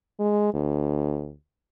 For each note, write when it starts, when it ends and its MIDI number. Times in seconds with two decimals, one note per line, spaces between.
0.19 0.53 56
0.54 1.32 38